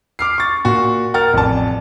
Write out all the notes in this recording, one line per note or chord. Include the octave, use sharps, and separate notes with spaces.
D6 F6 C7
C#6 A6
A#2 F#4 C#6
A#4 F#5 G5 F6 A6
A1 F2 C3 D5 A5